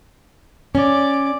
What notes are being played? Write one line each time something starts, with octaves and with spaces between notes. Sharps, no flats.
C#4 D5 D6